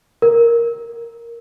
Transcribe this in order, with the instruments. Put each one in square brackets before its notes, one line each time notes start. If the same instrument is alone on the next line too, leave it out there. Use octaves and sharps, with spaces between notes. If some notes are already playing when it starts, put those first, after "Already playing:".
[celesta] A#4